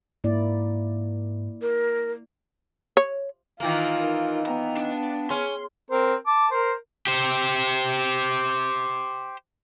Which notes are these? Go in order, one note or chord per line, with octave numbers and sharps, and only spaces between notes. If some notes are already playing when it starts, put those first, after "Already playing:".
G#2 A#3 E4 D5
A#4
C#5
D#3 E3 A#3 F4
D#4 A#4
B3 F5 G5 A#5
D4
C#4 G#4 C6
C4 A#4 C5
A5 D6
A#4 C5
G4 C5